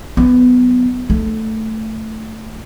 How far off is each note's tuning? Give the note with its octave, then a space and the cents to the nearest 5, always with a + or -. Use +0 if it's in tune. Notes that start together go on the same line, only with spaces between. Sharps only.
F#3 +30 B3 +15
A3 +0 D#4 -35